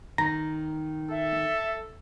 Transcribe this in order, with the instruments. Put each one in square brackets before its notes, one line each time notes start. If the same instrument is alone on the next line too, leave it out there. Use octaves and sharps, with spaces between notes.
[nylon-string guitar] D#3 [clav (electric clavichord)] A#5
[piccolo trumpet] A4 [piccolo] E5